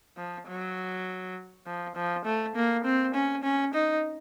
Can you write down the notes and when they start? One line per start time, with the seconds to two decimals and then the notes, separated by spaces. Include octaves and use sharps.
0.17 F3
0.48 F#3
1.67 F3
1.95 F3
2.25 A3
2.56 A#3
2.84 C4
3.14 C#4
3.44 C#4
3.74 D#4